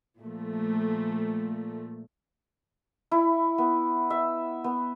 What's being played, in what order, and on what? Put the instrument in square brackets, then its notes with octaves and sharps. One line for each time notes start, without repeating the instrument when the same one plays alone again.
[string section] A#2 F3 A3
[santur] E4
B3
E5
B3